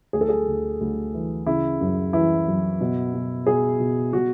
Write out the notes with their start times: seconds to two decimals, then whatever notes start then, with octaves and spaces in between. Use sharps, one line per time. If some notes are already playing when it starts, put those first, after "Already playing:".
0.13 D2 G#4
0.21 A4
0.29 G#4
0.48 D2
0.81 D2
1.14 E3
1.46 C#3 E4
1.81 F#2
2.13 E3 E4
2.48 F#2
2.81 B2
3.14 B2
3.47 B2 G#4
3.80 B2
4.13 B2 F#4